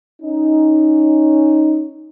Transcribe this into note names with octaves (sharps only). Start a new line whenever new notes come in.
C#4 D#4